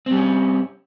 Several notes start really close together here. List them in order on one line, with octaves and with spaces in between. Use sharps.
C4 G3 C#4